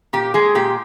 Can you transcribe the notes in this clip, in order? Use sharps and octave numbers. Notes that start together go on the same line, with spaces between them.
A#2 G4
G#3 G#4
A#2 G4